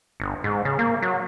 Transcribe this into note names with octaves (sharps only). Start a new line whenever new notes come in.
G1
G#2
C#3
A#3
F#3